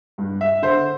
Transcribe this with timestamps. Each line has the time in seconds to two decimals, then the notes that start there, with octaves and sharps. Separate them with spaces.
0.18 G2
0.41 E5
0.62 D3 C5